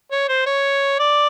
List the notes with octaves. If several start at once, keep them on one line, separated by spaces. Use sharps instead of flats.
C#5
C5
C#5
D5